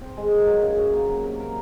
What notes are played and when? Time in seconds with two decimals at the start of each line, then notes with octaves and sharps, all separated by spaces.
0.01 C4
0.17 G#3
0.32 D#3
0.47 F#3
0.62 C#3
0.77 F#2
0.93 A#3
1.08 F#3
1.24 C3
1.40 A#4